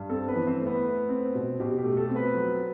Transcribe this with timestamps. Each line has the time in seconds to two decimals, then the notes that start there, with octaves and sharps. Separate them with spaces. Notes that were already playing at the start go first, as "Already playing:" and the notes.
Already playing: G2
0.10 C4 A4
0.28 B3 B4
0.35 E3
0.47 C4 C5
0.60 A3
0.66 B3 B4
0.85 A3
1.09 C4
1.35 B2
1.60 B2 G4
1.78 G4
1.84 A3
1.97 A4
2.10 C4
2.15 B3 B4
2.34 F#3